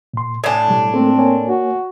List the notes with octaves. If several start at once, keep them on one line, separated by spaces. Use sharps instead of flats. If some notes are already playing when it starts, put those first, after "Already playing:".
A#2 C6
A2 D4 G#5 A5 D#6
B2 G3
A3 A#3 C4 A4
A#3 C#5 G#5
F#4